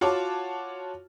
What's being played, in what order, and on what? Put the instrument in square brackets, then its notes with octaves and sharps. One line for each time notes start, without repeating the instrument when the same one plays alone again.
[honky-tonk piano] F4 F#4 C#5 A5 D6